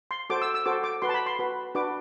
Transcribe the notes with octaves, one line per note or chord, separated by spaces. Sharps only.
C6
F#4 A4 C5 D6
E6
E6
F#4 A4 C5 D6
D6
F#4 B4 C6
A5
B5
C6
F#4 B4
D4 F#4 B4 D6